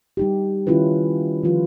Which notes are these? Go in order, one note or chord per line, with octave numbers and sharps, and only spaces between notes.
G3 D#4 G4
D#3 C#4 E4 F4 B4
D3 D#3 F3 F4 B4